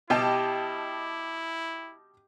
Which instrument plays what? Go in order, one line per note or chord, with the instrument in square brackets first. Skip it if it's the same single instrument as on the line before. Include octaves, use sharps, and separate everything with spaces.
[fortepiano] B2 [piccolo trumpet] E4 [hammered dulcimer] G4 [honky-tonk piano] D#5 G5 A5